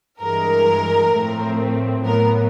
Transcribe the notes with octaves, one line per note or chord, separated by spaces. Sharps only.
G2 E3 G#3 A#4
A2 F3 A3 C4
A2 F#3 B3 A#4